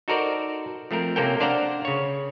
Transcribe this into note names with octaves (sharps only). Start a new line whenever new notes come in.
D#4 F#4 A4 A#4 C5 D5
F3 A3 C4 A#4
C3 A#3 C#4 A4 A#4 G5
D4 C5 D5 F5 F#5 A#5
C#3 C#5